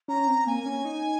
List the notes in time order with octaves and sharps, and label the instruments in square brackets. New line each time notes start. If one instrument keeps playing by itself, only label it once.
[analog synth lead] C#4 [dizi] A#5
[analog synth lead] C4
[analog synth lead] A#3 [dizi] G#5
[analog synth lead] C#4
D#4